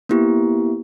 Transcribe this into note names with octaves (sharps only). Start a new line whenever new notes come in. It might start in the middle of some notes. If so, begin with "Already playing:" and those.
A#3 B3 E4 G4